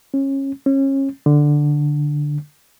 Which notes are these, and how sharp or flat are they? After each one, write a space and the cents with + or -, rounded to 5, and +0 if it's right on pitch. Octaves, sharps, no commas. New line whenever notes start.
C#4 -25
C#4 -30
D3 +5